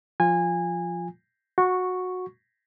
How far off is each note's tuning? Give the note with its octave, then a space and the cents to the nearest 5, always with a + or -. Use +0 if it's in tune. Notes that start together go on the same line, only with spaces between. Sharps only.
F3 +0 F4 +0 G#5 -20
F#4 -15 C#6 +0